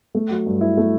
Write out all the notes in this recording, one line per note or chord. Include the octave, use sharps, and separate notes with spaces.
A3
F#3
G2
E4
A3